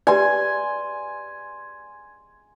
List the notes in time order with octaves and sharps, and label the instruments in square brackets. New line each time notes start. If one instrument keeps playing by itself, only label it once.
[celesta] G4 B4 D5 [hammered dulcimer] G#5 C6